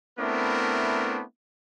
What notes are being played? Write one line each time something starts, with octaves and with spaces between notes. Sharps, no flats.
A3 B3 C4 D4 E4 A#4